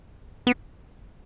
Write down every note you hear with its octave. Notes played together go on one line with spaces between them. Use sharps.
B3